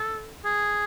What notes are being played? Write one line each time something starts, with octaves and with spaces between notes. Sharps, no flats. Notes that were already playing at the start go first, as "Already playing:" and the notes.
Already playing: A4
G#4